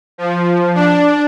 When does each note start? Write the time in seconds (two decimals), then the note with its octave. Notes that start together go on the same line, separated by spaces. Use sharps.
0.18 F3
0.75 D4